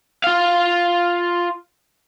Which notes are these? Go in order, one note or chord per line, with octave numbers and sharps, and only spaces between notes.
F4 F5